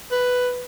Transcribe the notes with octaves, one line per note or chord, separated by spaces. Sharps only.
B4